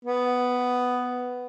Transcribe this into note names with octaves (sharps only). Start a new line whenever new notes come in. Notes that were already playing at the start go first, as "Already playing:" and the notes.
B3